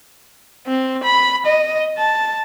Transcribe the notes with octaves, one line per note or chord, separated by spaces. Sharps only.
C4
B5
D#5
A5